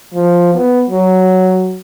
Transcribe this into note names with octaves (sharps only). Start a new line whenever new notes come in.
F3
B3
F#3